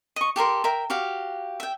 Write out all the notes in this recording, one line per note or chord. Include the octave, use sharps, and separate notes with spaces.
D#5 C#6
G4 A4 A#4 C6
A#4 E5 G5
F#4 G4 F5
E5 G5